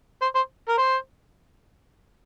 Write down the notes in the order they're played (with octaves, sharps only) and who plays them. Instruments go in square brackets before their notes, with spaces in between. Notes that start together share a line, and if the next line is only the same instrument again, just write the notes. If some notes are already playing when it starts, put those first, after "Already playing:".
[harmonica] C5
C5
A#4
C5